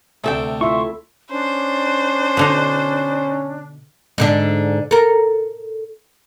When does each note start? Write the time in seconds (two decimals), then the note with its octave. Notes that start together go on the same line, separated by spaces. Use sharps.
0.24 D2 C3 A3 A4 G5
0.61 E4 F4 E5 C6 C#6
1.32 C#4 D4 C5
2.37 B2 D3 D#4
4.18 G#2 D3 D4
4.91 A4 A#4